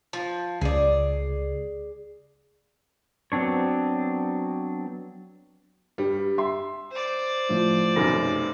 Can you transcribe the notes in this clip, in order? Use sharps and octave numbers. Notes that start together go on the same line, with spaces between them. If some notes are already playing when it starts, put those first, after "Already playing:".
F3
C#2 G#4 D5
F#3 B3 C4 D4 C#5
G2 G3
E5 C6
C5 D5
A2 F3
F1 B1 F#2 A#6